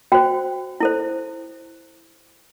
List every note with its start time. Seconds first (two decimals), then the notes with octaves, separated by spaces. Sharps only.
0.12 F#4 C5 G5
0.80 E4 A4 C5